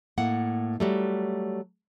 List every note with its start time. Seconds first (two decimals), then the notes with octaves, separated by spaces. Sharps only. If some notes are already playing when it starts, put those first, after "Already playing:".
0.18 A2 A#3 F#5
0.80 F#3 G3 A3